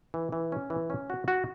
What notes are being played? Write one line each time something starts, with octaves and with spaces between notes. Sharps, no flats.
E3
E3
C#4
E3
C#4
F#4
F#4